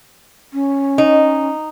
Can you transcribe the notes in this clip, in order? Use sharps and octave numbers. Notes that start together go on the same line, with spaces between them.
C#4
D#4